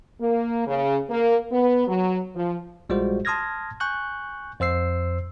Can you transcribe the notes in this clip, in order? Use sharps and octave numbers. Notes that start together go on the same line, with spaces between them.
A#3
C#3
A#3
B3
F#3
F3
A#1 G3 G#3 F4 F#4 C5
A5 C6 D#6 F6 G#6 A#6
G#5 C#6 F#6 G6
F2 C5 E6 C7